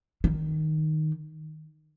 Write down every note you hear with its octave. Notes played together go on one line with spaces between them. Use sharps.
D#3